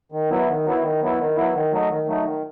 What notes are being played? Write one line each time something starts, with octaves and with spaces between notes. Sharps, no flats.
D#3
F#3 B3 E4
D#3
F#3 B3 E4
D#3
F#3 B3 E4
D#3
F#3 B3 E4
D#3
F#3 A3 D#4
D#3
F#3 A3 D#4
D#3